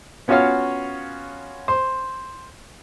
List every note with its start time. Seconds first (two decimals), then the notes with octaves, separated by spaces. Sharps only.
0.28 B3 C#4 F4 F#4 C#5 F5
1.68 C5